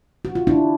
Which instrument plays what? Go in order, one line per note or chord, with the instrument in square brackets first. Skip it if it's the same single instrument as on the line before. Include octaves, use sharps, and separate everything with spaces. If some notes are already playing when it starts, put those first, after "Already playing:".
[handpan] F#4
F4
D4 E4